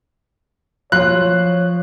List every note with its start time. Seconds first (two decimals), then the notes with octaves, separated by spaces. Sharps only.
0.92 F3 C#5 F#6